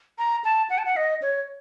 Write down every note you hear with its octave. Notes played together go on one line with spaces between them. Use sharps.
A#5
A5
F#5
A5
F#5
D#5
C#5